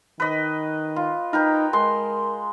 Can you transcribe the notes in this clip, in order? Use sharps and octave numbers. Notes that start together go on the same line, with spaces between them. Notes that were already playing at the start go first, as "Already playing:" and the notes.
D#3 B4 D#5
F4
D#4 A#4 B4 G5
G#3 A#4 C6